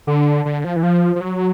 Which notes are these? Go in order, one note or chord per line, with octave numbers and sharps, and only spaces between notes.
D3
D3
F3
E3
F3
F3
F#3